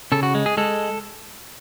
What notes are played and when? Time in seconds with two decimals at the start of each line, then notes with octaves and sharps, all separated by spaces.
0.12 C#3 A4
0.23 F#4
0.35 G#3
0.46 G#4
0.57 G#3 A4